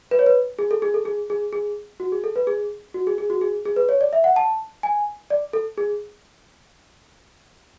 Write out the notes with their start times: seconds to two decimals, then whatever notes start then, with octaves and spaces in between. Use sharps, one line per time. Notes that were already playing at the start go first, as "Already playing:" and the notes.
0.11 B4
0.19 C#5
0.26 B4
0.59 G#4
0.71 A4
0.82 G#4
0.94 A4
1.05 G#4
1.30 G#4
1.53 G#4
2.00 F#4
2.12 G#4
2.24 A4
2.36 B4
2.47 G#4
2.94 F#4
3.07 G#4
3.18 G#4
3.30 F#4
3.41 G#4
3.65 G#4
3.76 B4
3.89 C#5
4.01 D5
4.13 E5
4.24 F#5
4.36 A5
4.83 G#5
5.30 D5
5.53 A4
5.78 G#4